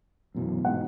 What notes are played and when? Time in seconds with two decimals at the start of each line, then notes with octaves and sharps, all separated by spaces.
0.35 F#2 B2 E3
0.65 A1 G#2 B2 F#5